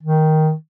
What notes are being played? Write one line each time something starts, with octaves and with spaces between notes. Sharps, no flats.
D#3